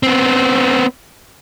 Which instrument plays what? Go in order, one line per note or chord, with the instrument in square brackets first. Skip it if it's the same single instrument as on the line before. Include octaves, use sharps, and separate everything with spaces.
[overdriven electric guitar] B3 C4